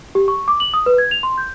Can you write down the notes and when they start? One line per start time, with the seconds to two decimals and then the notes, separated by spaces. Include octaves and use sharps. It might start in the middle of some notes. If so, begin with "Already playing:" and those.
0.15 G4
0.28 C#6
0.48 D6
0.60 F#7
0.74 D#6
0.86 B4
0.98 G#6
1.11 F7
1.23 C6
1.38 G6